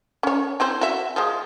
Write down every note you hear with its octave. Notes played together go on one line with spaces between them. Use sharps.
C#4 C#5
C4 E4 C5
F#4 E5
F3 G#3